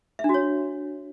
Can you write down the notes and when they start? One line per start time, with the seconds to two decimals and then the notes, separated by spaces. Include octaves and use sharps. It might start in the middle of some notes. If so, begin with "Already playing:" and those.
0.19 E5
0.24 D4
0.29 F#4
0.34 C#5